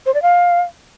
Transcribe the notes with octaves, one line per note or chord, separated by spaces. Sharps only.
C5
D5
F5